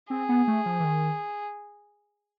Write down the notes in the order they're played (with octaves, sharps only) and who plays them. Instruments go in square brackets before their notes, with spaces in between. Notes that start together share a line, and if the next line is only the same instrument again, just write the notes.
[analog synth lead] C4 [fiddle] G#4
[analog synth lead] B3
A3
F3
E3
D#3